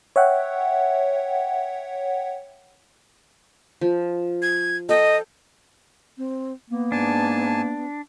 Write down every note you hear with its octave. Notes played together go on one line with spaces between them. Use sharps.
C#5 E5 F#5 G5
F3
G#6
A4 D#5 G5
C4
A#3 B3
G#2 D4 G#5 A5